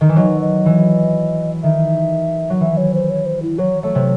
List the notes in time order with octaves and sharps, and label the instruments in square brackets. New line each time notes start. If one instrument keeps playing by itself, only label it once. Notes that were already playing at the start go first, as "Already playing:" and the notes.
[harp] D#3
E3
[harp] F#3 [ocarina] D#5
[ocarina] D#5
[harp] E3
[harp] D#3 [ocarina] E5
[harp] F#3
[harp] E3 [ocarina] E5
[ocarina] C#5
C5
C#5
C5
E4
[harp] F#3 [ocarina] C#5
[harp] A3 [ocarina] C#5
[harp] C3